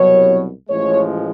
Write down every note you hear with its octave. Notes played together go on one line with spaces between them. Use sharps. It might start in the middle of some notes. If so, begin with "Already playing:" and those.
Already playing: C2 B2 F#3 C#5
A1 A2 F3 G#3 C#5